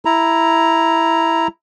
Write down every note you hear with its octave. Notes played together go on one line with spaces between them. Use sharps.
E4 A#5